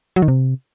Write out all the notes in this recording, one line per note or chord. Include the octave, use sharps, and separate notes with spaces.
F#3
D#3
C3